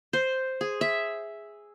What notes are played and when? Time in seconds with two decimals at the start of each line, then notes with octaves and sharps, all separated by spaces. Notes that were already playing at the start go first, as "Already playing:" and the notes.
0.13 C5
0.61 G#4
0.81 E5